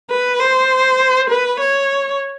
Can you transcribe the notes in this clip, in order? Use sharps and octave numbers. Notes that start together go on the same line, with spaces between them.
B4
C5
B4
C#5